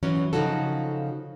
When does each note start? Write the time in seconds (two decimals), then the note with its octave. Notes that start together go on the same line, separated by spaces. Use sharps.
0.03 E3 F#3 C#4
0.33 C#3 F3 D#4 F#4 A4